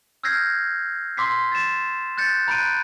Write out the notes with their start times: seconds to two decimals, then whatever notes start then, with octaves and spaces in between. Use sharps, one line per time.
0.23 E6 F6 G6 G#6 A#6 C7
1.17 C6 D6 E6 B6 C7
1.52 A6 E7
2.17 F#6 G6 A6 C#7
2.48 A#5 B5 F#6 G6 D7 D#7